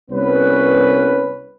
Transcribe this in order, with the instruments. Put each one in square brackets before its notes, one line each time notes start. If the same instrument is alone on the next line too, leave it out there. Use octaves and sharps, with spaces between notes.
[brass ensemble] C2 B3 C#4 B4